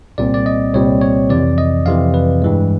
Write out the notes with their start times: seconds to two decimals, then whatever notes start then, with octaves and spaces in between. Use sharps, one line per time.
0.18 C2 A#2 G3 C4 D5
0.34 D5
0.46 D#5
0.74 C2 A#2 G3 C4 C#5
1.01 C#5
1.29 F2 C3 E3 D5
1.58 D#5
1.86 F2 C3 E3 F5
2.14 B4
2.42 G2 E3 G#3